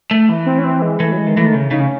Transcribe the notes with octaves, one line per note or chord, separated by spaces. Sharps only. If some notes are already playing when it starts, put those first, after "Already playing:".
A3
E3
C4
C#4
C4
G#3
E3 A3
F#3
G#3
D#3
E3 A3
D#3
C#3
C#3 D#4
C#4